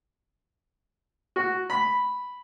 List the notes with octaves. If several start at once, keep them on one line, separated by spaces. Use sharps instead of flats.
F#4
B5